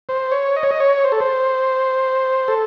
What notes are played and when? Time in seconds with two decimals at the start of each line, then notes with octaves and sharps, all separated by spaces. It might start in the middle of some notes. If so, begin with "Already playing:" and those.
0.09 C5
0.32 C#5
0.56 D#5
0.63 C#5
0.71 D#5
0.80 C#5
1.04 C5
1.12 A4
1.20 C5
2.48 A4